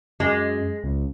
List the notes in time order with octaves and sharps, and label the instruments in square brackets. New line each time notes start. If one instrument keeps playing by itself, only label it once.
[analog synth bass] F#2 [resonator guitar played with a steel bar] G#3
[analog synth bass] C#2